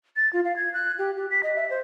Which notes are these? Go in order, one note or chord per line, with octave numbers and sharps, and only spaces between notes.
A6
F4
F5
G#6
F#6
G4
G4
B6
D#5
E5
C5